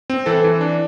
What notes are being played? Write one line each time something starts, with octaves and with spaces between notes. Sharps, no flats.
C4
E3 A4
E3
D4